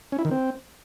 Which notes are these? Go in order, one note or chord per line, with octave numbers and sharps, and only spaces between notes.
C#4
E4
D#3
C4